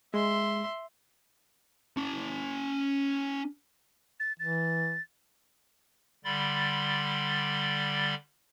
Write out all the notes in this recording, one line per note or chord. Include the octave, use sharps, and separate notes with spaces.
G#3 E5 C6
C#4 A5
A6
E3 A6
D3 G3 B5 C6 A6